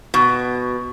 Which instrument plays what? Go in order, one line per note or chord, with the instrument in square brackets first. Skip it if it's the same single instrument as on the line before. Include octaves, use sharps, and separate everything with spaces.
[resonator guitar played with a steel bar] B2